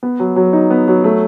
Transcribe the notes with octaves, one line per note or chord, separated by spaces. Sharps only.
B3
F#3
F#3
D#4
B3
F#3
A3